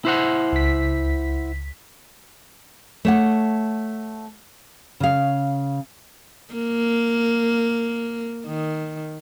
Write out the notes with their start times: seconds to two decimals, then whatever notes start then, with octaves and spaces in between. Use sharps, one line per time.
0.05 E4 C5 F#5
0.52 C#2 B6
3.05 A3 C#5 F#5
5.00 C#3 F5
6.54 A#3
8.46 D#3